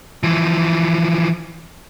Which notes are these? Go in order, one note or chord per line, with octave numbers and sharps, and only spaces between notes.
E3 F3